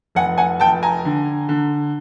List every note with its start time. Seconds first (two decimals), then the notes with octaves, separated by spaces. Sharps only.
0.15 F1 F#5 G#5
0.38 F#5 G#5
0.60 F1 G5 A5
0.83 G#5 A#5
1.05 D3
1.49 D3